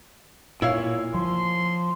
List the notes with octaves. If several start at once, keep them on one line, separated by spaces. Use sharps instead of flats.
A#2 E4 C#5 F5
F3 C6